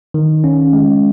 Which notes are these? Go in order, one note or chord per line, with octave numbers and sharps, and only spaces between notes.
D#3
C#4
G#3